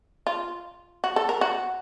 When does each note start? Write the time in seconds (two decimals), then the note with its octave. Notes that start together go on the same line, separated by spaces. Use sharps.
0.27 F4
1.04 F#4
1.16 A4
1.29 A#4
1.41 F#4